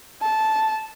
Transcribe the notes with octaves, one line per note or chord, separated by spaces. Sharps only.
A5